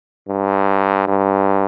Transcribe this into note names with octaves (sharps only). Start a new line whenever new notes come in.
G2
G2